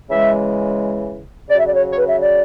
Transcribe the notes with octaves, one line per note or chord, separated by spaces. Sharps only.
C#3 E3 G#3 E5
C#3 F#3 D5
E5
D5
C#5
C#5
B4
E5
D5